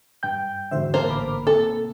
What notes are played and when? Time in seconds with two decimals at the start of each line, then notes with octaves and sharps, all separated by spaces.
0.23 G2 G5 G6
0.71 E2 G#2 D3 F#4 C5 E5
0.94 A#3 A#4 C5 A5
1.07 A1 B5 D6
1.47 C3 A#3 A4